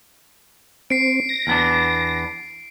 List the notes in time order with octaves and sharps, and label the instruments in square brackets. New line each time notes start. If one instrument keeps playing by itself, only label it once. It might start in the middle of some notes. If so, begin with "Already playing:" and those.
[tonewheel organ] C4 [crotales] C7 D7
[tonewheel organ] A#6
[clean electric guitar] E2 B3 D4